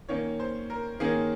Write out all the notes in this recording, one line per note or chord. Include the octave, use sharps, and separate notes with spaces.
D#3 A#3 C#4 C#5
C5
A#4
D#3 A#3 C#4 G#4